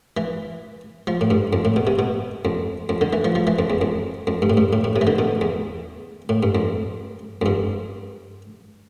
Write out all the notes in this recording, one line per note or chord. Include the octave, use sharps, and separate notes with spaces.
E3
F3
A2
G2
F2
A2
B2
C3
B2
F2
F2
D3
E3
F3
F3
E3
F2
E2
F2
F2
G2
A2
G2
A2
A2
C3
E3
D3
B2
E2
A2
G2
F2
F2
G2